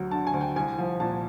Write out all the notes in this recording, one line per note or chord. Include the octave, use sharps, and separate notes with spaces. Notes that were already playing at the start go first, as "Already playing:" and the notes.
Already playing: D2 F#3
D3 A5
G#5
D2
G5
C2 G#5
F3
A#2 A5